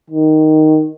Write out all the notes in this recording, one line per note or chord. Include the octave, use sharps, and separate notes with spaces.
D#3